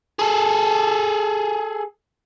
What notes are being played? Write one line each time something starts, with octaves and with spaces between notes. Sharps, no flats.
G#4 A4